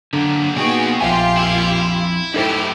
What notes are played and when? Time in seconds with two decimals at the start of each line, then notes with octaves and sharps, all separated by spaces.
0.13 D3 F#3 A#3
0.56 A#2 F3 B3 D#4 F#4 G#4 G5
1.00 A#1 F2 F4 G4 E5 G#5
1.37 E4
2.34 F#2 A2 D#4 E4 G4 A4 C5